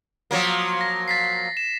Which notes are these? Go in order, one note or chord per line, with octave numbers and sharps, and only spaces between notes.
F3 F#3 A#3
A#6
A6 B6 C7
E7